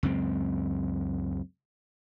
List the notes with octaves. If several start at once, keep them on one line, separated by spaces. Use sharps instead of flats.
C#2 F#2 C4